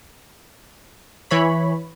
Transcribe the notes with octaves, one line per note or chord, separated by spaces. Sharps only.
E3 C#5 B5